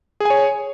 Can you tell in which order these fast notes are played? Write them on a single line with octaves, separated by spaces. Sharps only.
G#4 G#5 C#5